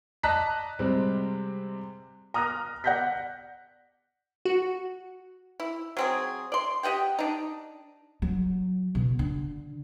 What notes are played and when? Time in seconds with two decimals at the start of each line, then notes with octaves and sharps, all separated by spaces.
0.23 D5 D#5 A5 A#5 F#6 B6
0.79 C3 G3 G#3 C4
2.34 A#5 D#6 F6 F#6 A#6
2.84 D5 F#5 F#6 G6 A#6 B6
4.45 F#4
5.60 E4
5.97 F#3 C4 G#4
6.52 D5 C6
6.83 G4 D#5 F#5 G5
7.19 D4 D#4
8.22 F#3
8.95 B2
9.19 D3